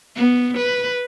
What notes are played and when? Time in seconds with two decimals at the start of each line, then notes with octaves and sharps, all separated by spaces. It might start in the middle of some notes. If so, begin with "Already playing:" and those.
0.17 B3
0.58 B4